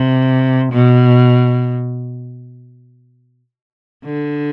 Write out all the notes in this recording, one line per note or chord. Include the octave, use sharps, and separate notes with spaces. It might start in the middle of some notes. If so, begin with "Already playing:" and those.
Already playing: C3
B2
D3